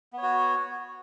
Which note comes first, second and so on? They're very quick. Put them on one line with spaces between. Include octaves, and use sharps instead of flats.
B3 C#5 F#4